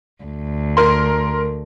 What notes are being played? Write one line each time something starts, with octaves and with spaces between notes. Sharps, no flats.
D2
A#4 C6